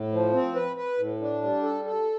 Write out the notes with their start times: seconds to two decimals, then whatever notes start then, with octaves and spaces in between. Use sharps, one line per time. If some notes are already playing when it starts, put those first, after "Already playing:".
Already playing: A2
0.12 F3
0.33 C4
0.55 B4
0.76 B4
0.98 A2
1.21 D4
1.42 G3
1.63 A4
1.85 A4